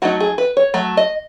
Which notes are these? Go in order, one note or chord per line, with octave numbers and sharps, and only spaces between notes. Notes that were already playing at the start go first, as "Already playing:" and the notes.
F#3 A3 D#4 F#4
G#4
B4
C#5
F#3 A3
D#5